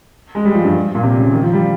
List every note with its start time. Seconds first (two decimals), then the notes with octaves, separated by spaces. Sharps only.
0.35 G#3
0.45 G3
0.54 F3
0.65 G2
0.95 A#2
1.03 C3
1.18 C#3
1.33 D#3
1.43 F3
1.53 G3